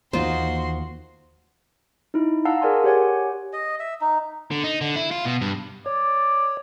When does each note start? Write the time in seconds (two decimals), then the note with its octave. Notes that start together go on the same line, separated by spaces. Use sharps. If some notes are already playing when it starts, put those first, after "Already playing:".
0.13 D#2 E3 A#3 D#4 F4 F#4 C5 C6
2.14 D#4 E4
2.45 F5 F#5 A5 A#5 E6
2.62 G#4 A#4 D5 G#5 C6
2.84 G4 C5 C#5 F#5 G#5
3.53 D#5
3.80 E5
4.01 D#4
4.51 D3
4.64 D#4
4.81 D3
4.96 E4
5.11 F4
5.25 B2
5.41 G2
5.86 C#5 D5